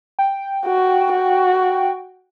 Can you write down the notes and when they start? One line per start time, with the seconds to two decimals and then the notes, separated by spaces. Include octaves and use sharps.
0.19 G5
0.65 F#4
1.12 F#4